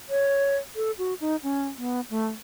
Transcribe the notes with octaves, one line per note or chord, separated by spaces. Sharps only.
C#5
A4
F#4
D#4
C#4
B3
A3